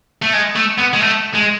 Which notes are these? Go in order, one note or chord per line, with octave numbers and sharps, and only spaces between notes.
A3
G#3
A3
B3
G#3
A3
G#3